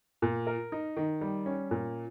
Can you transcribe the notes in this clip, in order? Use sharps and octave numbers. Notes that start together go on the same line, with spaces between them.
A#2
A#4
D#4
D#3
G3
C#4
A#2